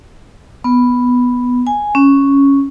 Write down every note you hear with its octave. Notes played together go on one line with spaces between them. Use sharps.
B3
G#5
C#4